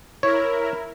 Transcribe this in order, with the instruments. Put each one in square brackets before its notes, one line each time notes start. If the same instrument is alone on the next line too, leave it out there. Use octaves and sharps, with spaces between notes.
[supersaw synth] E4 A#4 [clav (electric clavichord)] C#5